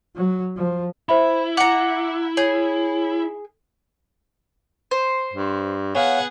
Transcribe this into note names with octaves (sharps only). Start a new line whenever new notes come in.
F#3
F3
E4 C5 E5 B5
F#5 A#5 D6 C#7
G#4 C#5
C5
G2
B3 G#4 C#5 F5 F#5